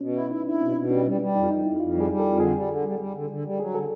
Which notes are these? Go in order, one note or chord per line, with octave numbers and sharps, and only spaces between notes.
B2 C#4
E4
D#4 E4
D4 E4
B2 C4
B2
G3 C#4
G3
G3
F2 D#4
F2 D#4
F2 E4
F2 F4
G3
G#4
G3
A4
F2
D3 G#4
G3
D3
G3
G3
D3
D3
G3
F#3 G#4
D3 A4